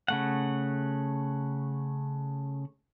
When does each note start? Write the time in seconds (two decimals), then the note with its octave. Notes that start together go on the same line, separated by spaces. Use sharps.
0.08 C#3 A3 F#5